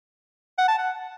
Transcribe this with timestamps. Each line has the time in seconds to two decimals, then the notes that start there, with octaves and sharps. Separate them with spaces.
0.58 F#5
0.68 A5
0.78 F#5